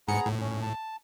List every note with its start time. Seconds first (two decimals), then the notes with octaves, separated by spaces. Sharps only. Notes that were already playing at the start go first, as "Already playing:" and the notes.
0.08 G#2 B3 G#4 A#5 C#7
0.26 A2
0.41 C#4
0.62 A5